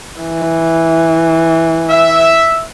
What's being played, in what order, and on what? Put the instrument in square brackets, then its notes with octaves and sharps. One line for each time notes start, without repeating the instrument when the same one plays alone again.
[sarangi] E3
[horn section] E5